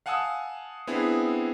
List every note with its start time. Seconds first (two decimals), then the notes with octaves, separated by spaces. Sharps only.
0.06 F5 F#5 G#5 A5 D#6 E6
0.87 B3 C4 D4 E4 G#4